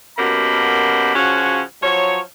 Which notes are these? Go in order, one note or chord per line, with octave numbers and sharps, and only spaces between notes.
F#2 B2 A#3 G4 B5
C#3 F3 C#4 F#4
F3 F#3 C#5